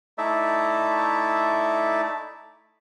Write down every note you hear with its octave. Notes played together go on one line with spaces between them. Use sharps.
A3 D#4 E4 D5 E5